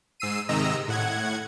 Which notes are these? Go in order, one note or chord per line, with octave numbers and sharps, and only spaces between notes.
G#2 E6 C7 D#7
G#2 C3 D#3 D#5 A#5 E6
A2 F#5 G#6